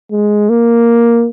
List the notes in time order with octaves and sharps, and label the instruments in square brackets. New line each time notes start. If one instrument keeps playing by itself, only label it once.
[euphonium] G#3
A#3